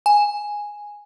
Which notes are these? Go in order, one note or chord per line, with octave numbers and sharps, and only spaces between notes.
G#5